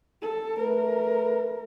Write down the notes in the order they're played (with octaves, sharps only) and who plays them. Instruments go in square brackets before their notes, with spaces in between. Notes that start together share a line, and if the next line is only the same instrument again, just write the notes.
[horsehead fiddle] A4
[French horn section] A3 B4 [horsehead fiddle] A#4